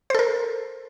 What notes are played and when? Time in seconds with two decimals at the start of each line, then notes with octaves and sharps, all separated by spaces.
0.10 C5
0.15 A4
0.19 A#4